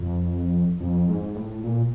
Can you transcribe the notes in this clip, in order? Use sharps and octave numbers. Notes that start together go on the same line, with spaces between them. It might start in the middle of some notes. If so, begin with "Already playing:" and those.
Already playing: F2
F2
G#2
A2
A#2